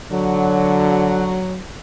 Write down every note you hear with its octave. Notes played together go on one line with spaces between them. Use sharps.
D3 F#3